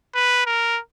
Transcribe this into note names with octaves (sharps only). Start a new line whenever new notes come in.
B4
A#4